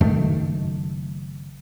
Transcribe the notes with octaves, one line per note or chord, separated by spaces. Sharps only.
F#1 F#2 D#3 A3